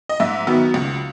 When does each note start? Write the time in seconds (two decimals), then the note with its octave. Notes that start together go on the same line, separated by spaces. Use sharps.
0.09 D#5
0.20 G#2 E5
0.47 D#3 F#3 B3
0.74 C#2